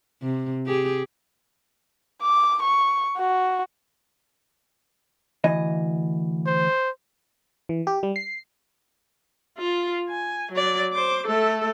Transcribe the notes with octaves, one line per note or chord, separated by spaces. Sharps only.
C3
G4 G#4
D6
C#6
F#4
D2 E3 D#5
C5
E3
G4
G3
C7
F4
G#5
F#3 D5
C5 D6
A3 A4